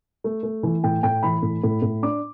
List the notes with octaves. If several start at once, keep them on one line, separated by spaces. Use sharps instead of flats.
A3
A3
E3
A2 G5
A2 G5
E3 B5
A2
A2
A2
D4 D6